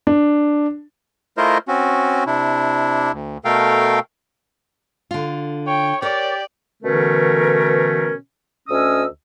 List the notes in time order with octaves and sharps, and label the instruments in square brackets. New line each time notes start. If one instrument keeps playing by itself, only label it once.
[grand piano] D4
[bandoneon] A3 E4 F4 A#4 C5 D#5
C4 C#4 F#4
C3 D4 E4
D2
B2 A3 A4 A#4 F5 G5
[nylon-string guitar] D3 F4
[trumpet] C#5 [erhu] G5
[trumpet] G4 [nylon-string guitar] A#4 C#5 [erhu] D5
[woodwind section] B2 D3 E3 A3 C#4 A#4
D2 C#4 D#5 D#6 E6